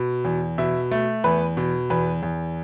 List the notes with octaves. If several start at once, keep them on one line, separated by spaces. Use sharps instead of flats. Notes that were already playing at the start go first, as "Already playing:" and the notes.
Already playing: B2
E2
B2 E5
A3
E2 B4
B2
E2 B4
E2